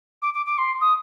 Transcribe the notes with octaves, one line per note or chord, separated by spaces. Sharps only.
D6
D6
D6
C6
D#6